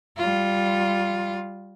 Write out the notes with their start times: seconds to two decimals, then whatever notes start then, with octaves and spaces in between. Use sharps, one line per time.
0.17 G3 F4